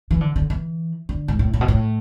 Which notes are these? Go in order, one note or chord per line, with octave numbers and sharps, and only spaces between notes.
E3
D3
D3
E3
D3
G#2
A2
A2
B2
A2